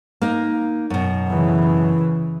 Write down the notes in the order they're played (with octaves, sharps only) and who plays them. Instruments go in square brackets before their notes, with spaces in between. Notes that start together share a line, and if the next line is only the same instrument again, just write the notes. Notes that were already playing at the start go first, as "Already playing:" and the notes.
[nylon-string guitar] A#3 D#4
F#2 B2
[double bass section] C#3 E3